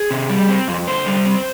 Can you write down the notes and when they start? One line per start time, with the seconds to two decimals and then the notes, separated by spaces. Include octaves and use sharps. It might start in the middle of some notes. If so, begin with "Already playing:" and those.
Already playing: G#4
0.11 C3
0.30 G3
0.49 C4
0.68 F2
0.87 D3 C5
1.06 G3
1.26 C4